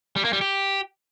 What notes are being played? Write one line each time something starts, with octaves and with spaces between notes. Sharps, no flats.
G3
A#3
G3
G4